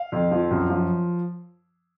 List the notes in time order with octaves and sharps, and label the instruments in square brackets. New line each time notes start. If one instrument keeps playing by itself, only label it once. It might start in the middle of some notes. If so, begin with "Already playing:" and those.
Already playing: [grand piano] F5
F2
F3
F#2
F3